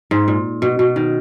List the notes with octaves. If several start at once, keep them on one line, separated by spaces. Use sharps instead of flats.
G#2
A#2
B2
B2
D#3